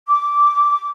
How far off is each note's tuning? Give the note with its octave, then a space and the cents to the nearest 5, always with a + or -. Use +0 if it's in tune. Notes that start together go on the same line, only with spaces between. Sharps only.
D6 -10